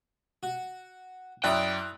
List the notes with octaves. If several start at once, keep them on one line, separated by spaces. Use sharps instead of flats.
F#4
F#2 E4 D5 G5 A#5 D#6 F#6